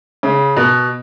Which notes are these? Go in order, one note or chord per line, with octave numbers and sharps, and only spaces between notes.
C#3
B2